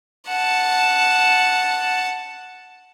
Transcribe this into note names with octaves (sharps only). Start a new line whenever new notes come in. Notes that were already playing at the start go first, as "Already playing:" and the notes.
F#5 A5